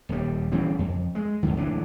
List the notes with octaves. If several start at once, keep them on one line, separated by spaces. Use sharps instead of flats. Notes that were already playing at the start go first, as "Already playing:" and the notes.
D#1 G3
C#3 E3 G3 C4
F2
G#3
E2 D3
D1 C#2 E3 D4